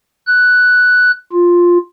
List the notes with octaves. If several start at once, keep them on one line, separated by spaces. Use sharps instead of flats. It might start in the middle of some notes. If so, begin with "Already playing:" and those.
F#6
F4